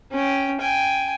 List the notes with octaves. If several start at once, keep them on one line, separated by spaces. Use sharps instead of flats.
C#4 G5
G5 G#5